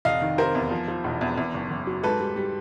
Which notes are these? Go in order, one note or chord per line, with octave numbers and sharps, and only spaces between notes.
F1 D#5 F5
D#3
C3 A#4 C5
E2
F3
F3
E1
E2
E2
F#1
F#1
F#3
G#2 A4 B4
G3
G3